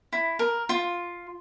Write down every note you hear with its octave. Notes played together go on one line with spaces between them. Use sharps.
E4
A#4
F4